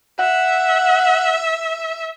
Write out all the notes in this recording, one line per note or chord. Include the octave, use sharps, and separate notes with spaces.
E5 F#5